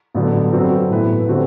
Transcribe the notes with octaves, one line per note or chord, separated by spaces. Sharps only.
A1 G2 D3 F#3 B3
G2 F#3 C4 F#4 A4
A2 E3 B3 E4 B4
D3 G3 C4 F#4 C5